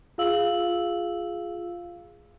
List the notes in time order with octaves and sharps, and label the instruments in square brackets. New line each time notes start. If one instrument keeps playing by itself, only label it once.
[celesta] F4 G#4 F5 E6 F#7